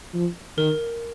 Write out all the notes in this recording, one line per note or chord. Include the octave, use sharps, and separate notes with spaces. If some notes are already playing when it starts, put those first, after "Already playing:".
F3
D#3 A#4